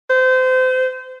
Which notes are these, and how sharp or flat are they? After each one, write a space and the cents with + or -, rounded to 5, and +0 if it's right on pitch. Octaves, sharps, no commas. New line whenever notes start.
C5 -30